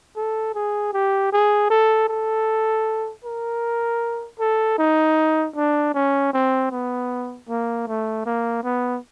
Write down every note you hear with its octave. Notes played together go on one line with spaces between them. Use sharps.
A4
G#4
G4
G#4
A4
A4
A#4
A4
D#4
D4
C#4
C4
B3
A#3
A3
A#3
B3